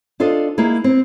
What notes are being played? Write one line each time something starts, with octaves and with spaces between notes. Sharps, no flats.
D4 F4 A4 C5 D#5
A#3 D#4 E4 G#4
C4